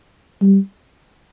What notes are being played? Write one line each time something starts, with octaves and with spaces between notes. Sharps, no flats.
G3